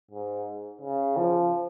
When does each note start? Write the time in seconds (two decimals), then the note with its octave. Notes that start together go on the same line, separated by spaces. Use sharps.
0.11 G#2
0.81 C#3
1.17 F3